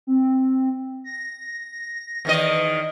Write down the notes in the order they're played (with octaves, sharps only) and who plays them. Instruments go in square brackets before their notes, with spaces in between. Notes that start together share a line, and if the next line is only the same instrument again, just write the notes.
[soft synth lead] C4
A#6
[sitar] E2 D#3 D#5